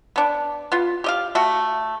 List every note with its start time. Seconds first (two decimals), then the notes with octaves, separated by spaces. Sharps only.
0.16 B3 D4
0.72 B3 F4
1.04 G4 D#5 F5
1.35 A3 F#4